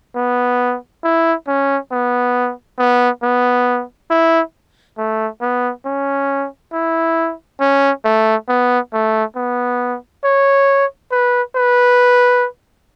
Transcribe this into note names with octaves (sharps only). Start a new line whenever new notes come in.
B3
E4
C#4
B3
B3
B3
E4
A3
B3
C#4
E4
C#4
A3
B3
A3
B3
C#5
B4
B4